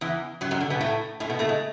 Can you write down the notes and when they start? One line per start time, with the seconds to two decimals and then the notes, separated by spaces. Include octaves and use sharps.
0.01 E2 E3
0.41 F#2 F#3
0.51 F#2 F#3
0.61 D3
0.70 B2 B3
0.81 A2 A3
1.20 A2 A3
1.30 B2 B3
1.39 A2 A3
1.49 G#3